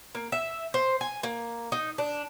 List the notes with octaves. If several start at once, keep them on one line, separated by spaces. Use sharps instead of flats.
A#3
E5
C5
G#5
A#3
D#4
D4